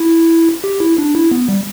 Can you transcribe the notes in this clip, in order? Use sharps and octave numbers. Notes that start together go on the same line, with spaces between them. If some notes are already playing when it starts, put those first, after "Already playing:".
Already playing: E4
G4
E4
D4
E4
B3
G3